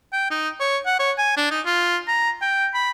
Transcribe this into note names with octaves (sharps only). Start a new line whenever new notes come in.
G5
D#4
C#5
F#5
C#5
G#5
D4
D#4
F4
A#5
G5
B5